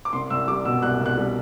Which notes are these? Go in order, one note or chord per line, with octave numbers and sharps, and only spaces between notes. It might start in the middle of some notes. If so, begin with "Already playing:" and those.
D6
C2 C6
C2 E6
G3 D6
B2 E6
C2 F#6
C2
F#6
G3